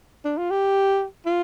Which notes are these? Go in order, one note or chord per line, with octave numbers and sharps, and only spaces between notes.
D4
F4
G4
F4